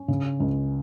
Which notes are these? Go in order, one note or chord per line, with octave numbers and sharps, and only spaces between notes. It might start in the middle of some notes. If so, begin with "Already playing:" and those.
Already playing: C#4
C#3
C#2